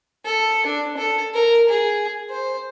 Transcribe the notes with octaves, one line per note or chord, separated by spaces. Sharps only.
A4
D4
A4
A#4
G#4
C5